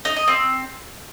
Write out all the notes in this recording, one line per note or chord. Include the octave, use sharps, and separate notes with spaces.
D#4
D#5
C4